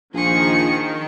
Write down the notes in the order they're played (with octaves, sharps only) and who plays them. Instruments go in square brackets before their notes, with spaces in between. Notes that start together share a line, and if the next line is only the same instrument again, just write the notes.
[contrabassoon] A#1 [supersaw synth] D#3 [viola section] F3 [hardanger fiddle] G#4 C#6